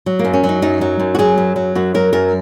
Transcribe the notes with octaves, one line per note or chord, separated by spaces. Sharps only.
F#3
A#3
F#2
C#4
F#3
D#4
F#2 D#4
F#3
F#2
F#4
F#3 G#4
F#2
F#3
F#2 F#4
F#3 A#4
F#2 A#4